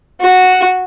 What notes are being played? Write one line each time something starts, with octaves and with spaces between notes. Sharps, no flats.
F#4